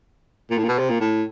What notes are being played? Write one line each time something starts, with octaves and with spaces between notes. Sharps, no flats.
A#2
A2
A#2
B2
C3
A#2
A2